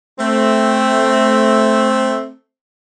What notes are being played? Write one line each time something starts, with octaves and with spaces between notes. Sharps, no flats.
A3 C4